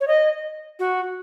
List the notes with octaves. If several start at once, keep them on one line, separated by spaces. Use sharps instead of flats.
C#5
D#5
F#4